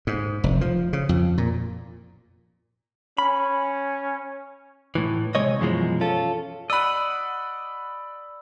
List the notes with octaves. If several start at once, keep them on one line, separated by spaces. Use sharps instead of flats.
G#2
F1
F3
C#3
F2
A#2
C#4 B5
A2 E3
C3 G#3 C#5 D#5
F#2 B2 E3 F3 G#3
C#4 F4 A4
D5 D#5 F#5 B5 E6